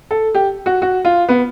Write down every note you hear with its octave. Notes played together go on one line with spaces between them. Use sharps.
A4
G4
F#4
F#4
F4
B3